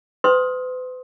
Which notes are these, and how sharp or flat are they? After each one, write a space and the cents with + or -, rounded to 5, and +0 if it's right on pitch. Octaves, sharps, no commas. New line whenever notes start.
B4 +45 C6 +15 D#6 +20